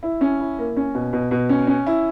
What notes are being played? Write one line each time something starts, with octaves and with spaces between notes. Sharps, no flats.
E4
C#4
E4
A#3
C#4
B2
B2
B2
C#4
C#4
E4